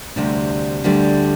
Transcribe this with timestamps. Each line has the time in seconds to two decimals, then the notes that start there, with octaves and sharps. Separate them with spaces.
0.16 D2 C3 G3 D4
0.84 D2 D3 G3 D4